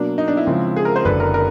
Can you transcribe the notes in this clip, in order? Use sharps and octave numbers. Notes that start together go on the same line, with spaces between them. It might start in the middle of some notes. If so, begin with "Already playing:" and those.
Already playing: B2 F#3 A#3 D4
D#4
D4
E4
C#3 F3 G#3 C4
G#4
A#4
C5
F#1 F#2 D3 B4
A#4
A#4